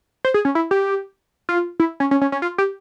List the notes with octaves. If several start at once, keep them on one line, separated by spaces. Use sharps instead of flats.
C5
G#4
C#4
E4
G4
F4
E4
C#4
C#4
C#4
C#4
F4
G4